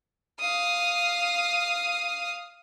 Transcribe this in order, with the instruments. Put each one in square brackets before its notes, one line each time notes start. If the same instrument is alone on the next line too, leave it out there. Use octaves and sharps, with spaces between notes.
[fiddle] F5 D#6